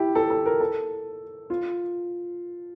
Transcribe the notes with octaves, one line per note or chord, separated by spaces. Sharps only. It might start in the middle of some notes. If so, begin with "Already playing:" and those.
Already playing: E4 G4
A4
A4
A#4
A4
F4